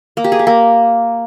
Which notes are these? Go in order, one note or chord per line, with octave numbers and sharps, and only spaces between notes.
A#3
G4
G#4
G4
A#3